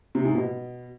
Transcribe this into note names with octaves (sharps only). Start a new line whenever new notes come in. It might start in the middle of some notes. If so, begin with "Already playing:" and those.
C3
G#2
B2